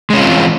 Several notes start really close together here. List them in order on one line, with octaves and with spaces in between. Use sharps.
G#3 C#4 F4 C4 E3